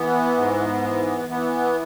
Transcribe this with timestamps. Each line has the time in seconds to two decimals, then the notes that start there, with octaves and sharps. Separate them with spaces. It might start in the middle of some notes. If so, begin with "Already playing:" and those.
Already playing: E3 B3
0.37 G#2
0.84 E3
1.29 E3 B3